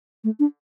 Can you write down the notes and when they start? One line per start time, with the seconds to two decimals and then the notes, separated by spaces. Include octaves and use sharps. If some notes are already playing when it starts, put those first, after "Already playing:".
0.24 A3
0.39 D4